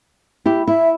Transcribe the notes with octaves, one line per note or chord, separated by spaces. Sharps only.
E4 G4
E4 E5